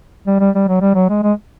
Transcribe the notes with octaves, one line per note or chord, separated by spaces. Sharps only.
G3
G3
G3
F#3
G3
F#3
G#3
G#3